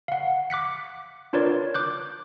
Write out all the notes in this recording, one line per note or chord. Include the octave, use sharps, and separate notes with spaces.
F5 F#5
D6 F#6 B6 C#7
D4 F4 A#4 B4 C#5 D5
D6 F#6 G6